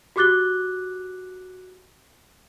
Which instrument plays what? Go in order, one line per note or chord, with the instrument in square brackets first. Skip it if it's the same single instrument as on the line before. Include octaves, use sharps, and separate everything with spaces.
[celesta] F#4 G4 D6 F#6 A6 G7